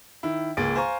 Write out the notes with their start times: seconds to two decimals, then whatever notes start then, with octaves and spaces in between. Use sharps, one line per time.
0.23 D#3 E4
0.57 C#2 A#3 G#4 A6 D7
0.75 C5 F5 G#5 A#5 C#6